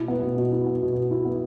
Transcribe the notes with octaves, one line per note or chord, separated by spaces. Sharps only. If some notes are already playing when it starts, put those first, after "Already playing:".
Already playing: B2 E4
B3
B2
B2
E4
B3
B2
B2
E4
B3